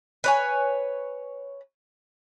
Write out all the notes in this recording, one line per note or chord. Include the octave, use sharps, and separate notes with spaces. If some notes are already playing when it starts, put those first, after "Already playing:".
B4 C#5 G#5